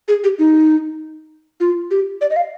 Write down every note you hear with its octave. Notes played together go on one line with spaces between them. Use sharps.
G#4
G4
D#4
F4
G4
D5
D#5
F5